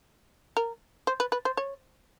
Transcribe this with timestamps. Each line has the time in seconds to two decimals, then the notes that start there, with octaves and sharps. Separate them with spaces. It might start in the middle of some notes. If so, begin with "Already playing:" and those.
0.57 A#4
1.07 C5
1.20 B4
1.32 B4
1.45 C5
1.57 C#5